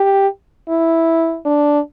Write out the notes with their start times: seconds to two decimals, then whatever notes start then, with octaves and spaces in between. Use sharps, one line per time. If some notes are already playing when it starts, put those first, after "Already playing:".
Already playing: G4
0.69 E4
1.45 D4